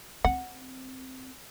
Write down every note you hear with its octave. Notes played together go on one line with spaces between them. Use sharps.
C4 F#5